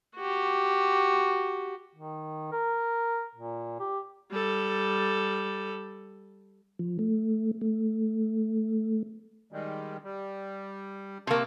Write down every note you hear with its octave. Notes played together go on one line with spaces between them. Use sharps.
F#4 G4
D#3
A#4
A#2
G4
G3 A4
F3
A3
A3
D#3 G3 G#3
G3
C3 A#3 A5 C#6